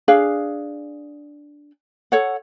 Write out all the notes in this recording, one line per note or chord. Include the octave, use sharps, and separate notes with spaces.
D4 G#4 F5
A4 C#5 F#5